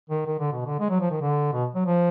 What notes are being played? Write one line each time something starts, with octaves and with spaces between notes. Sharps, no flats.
D#3
D#3
D3
B2
D3
G#3
F#3
F3
D#3
D3
B2
F#3
F3